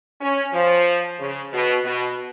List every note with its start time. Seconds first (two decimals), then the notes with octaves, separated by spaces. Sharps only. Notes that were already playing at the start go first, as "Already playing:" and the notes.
0.20 C#4
0.53 F3
1.19 C#3
1.52 B2
1.84 B2